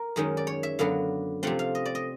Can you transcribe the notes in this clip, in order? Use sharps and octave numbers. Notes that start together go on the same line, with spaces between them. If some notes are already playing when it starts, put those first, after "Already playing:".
Already playing: A#4
F#2 D#3 G#3 C#4
D5
C#5
E5
F#2 D3 F#3 B3 F5
C3 F3 A3 C4 F#5
F5
D#5
D5
D#5